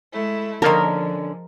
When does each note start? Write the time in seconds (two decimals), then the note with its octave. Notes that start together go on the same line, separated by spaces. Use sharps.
0.12 G#3 A3 E4
0.62 D3 D#3 F3 G#3 A#3 C#4 A#4 A5